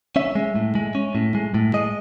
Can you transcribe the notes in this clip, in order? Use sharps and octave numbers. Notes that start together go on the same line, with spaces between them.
C#4 E5
G#3
A2
G#3
C#4
A2
G#3
A2
G#3 D#5